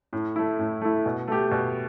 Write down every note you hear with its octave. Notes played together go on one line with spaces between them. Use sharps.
A2
A3 E4
A2
A3 E4
B2
A3 G4
B2